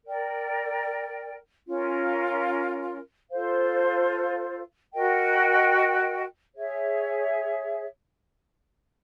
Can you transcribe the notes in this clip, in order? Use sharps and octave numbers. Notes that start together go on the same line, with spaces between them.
A#4 D5 G5
C#4 F4 A#4
F4 A4 C5 F5
F#4 A#4 D#5 G5
G#4 C#5 E5